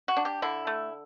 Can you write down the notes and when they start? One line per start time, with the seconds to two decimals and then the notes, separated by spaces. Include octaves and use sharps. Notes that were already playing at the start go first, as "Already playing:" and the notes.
0.08 F#4
0.17 D4
0.25 G4
0.42 D3 E4
0.67 A3